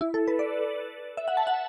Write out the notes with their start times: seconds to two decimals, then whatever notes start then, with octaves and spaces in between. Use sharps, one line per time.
0.01 E4
0.14 A4
0.28 B4
0.39 D5
1.17 E5
1.28 F#5
1.37 A5
1.47 F#5